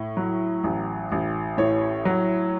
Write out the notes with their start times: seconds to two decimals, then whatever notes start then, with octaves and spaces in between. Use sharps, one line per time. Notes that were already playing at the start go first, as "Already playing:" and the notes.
Already playing: A2
0.17 F#3
0.64 A1
1.12 A1
1.58 A2 C#5
2.05 F#3